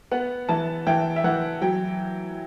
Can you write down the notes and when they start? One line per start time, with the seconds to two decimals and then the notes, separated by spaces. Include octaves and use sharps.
0.11 B3 F#5
0.49 E3 A5
0.87 E3 G5
1.16 E5
1.24 E3 F#5
1.62 F#3 G5